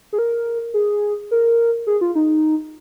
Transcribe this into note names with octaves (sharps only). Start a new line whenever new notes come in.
G#4
A#4
G#4
A#4
G#4
F4
D#4